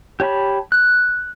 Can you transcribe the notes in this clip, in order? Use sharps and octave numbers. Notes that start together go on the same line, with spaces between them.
G4 C#5 A5 B5
F#6